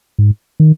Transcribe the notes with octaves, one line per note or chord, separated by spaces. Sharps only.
G#2
D#3